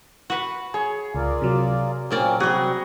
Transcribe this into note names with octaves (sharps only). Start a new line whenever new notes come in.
F#4 B4
G#4 C#5
C#2 F4 A#4 D5
C3 F#3
A#2 C#3 A#3 C4 C#4 D5
G3 C4 F#4 G#4